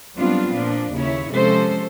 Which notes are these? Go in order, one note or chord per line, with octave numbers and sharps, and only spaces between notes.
F#3 G3 B3 C4 D4 F4
A#2 F3 D4
D#2 C#3 E4 C#5
C3 F3 G#3 C#4 A4 C5